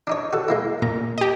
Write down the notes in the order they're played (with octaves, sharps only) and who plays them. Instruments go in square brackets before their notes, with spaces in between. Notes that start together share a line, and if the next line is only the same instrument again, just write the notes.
[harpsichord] D4 D#4 C#5
F#4 A4
G#3 A#3 E4
[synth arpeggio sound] A#2 [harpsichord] A#5
[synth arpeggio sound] G4 D#5